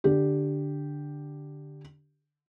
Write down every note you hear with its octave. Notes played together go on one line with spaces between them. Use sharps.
D3 G4